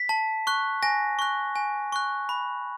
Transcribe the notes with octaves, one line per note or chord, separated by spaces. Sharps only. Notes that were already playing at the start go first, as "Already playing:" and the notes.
Already playing: B6
A5
C#6 F#6
G#5 A#6
C#6 F#6
G#5
C#6 F#6
B5